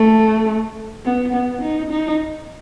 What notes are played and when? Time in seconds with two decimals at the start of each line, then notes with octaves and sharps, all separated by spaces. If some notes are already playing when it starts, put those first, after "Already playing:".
Already playing: A3
1.05 B3
1.34 B3
1.62 D#4
1.91 D#4